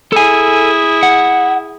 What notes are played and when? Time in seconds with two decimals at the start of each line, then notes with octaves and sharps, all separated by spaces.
0.12 E4 G#4 A4 G#5
1.03 F#5